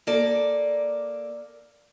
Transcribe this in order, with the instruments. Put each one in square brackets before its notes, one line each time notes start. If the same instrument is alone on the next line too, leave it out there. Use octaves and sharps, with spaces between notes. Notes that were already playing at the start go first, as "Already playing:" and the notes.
[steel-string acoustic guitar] A#3 A4 D5